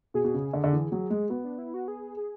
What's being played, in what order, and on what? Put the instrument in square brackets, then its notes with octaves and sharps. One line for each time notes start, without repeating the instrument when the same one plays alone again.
[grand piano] B2 [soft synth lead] G#4
[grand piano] B2
C#3
D3
D3
E3
F#3
G#3
[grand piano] B3 [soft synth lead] F#4
[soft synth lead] D4
E4
F#4
G#4
G#4